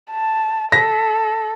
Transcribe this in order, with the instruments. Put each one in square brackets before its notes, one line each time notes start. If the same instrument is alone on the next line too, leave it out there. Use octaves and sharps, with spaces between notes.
[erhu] A5
[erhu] A4 [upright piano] A#6 B6